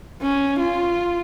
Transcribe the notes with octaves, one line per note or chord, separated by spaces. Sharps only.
C#4
F4